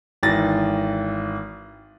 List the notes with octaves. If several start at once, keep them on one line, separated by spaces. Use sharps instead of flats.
G#1 E3 A6 A#6